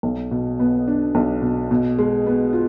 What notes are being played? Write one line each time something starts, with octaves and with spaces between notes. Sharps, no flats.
B1
B2
B3
D4
B1
B2
B2
G#3
B3
F4